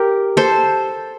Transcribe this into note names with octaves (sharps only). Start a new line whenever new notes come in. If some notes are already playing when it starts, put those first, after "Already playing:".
Already playing: G4 A#4
A4 C5